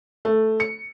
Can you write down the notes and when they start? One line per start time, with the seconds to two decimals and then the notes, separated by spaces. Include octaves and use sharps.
0.25 A3
0.60 C#7